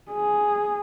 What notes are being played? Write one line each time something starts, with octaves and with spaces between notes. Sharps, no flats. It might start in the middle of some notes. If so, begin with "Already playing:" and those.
G#4